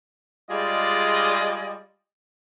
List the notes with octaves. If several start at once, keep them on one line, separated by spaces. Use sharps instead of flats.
G3 G#3 F4 G#4 D5 D#5